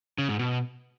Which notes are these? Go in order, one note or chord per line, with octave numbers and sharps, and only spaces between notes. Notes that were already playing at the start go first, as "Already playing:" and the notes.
C#3
G#2
B2